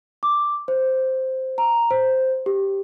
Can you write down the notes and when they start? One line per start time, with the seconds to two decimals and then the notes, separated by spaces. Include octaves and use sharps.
0.23 D6
0.68 C5
1.58 A#5
1.91 C5
2.46 G4